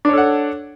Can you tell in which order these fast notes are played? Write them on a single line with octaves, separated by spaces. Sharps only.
D4 C#5 A4 F#5